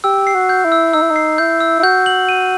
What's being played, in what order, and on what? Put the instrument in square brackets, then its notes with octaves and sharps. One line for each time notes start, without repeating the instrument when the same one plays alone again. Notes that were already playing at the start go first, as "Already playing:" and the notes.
[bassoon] G4 [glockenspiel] E6
[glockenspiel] C7
[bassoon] F#4
[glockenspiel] G6
[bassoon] E4
[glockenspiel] E6
[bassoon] D#4 [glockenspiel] E6
[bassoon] E4
D#4
[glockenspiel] C7
[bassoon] E4 [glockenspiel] G6
[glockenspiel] E6
[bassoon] E4
[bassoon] F#4 [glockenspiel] G6
[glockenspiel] F#7
D#7